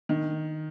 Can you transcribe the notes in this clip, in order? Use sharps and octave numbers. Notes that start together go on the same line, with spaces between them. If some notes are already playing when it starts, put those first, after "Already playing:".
D#3